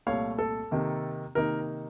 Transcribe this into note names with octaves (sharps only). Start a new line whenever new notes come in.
C2 A#2 A3 C#5 F5
A4
C3 D#3 A#3
C3 D#3 A#3 D#4 A#4